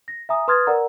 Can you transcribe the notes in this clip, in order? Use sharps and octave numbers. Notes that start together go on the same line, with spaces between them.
A#6
E5 G#5 A#5 D#6
B4 C6 D#6 F6 G#6 A6
A#4 D5 F#5 A#5